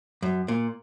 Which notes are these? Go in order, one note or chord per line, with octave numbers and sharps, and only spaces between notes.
F#2
A#2